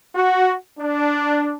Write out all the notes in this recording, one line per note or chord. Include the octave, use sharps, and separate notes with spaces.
F#4
D4